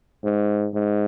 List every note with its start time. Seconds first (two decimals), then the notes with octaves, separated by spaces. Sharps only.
0.24 G#2
0.74 G#2